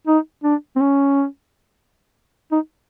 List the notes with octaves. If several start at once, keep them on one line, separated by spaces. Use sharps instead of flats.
D#4
D4
C4
C#4
D#4